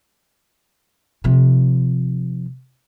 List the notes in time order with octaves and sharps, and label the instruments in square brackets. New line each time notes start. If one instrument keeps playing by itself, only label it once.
[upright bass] C3 F3